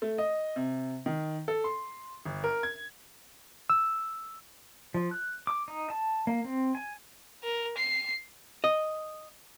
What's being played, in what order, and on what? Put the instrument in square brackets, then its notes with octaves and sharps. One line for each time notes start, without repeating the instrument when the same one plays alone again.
[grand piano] A3
D#5
C3
D#3
A4
C6
G1
A#4
G#6
[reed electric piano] E6
[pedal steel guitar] F3
F#6
D6
D#4
A5
A#3
C4
G#5
[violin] A#4
C7
[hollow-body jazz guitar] D#5